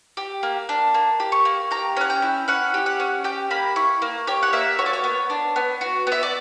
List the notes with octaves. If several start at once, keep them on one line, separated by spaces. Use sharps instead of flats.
G4
A#3
D4
A#3
G4
C#6
A#3
G4 A#5
C#4 F#5
G5
E4
C#4 F#5
G4
F#5
C#4
G4 G5
A#3 B5
E4 C#6
A#3
G4 C#5
F#5
A#3 E5
F#4 C#5
D5
C#5
B3
D4
B3
F#4
B3 E5
D5